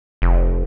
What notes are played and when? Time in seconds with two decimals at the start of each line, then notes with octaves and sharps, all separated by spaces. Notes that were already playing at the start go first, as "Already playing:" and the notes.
0.22 F1